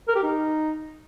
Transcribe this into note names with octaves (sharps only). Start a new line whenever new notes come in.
A#4
G4
D#4